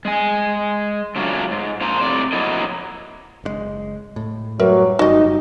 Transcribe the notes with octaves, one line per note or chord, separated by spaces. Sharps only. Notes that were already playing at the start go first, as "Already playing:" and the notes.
G#3 G#5
C#3 F#3 A3 C#4 D4 F4
G#2
A#2 F3 C5 A#5
A2 C3 D5
F3 F#3 A#3 E4 A#4 D#5
F#1 C#3 G#3
A2
F#2 A2 F#3 G3 A#4 B4 E5
F#1 G2 G3 D#4 F#4 D#5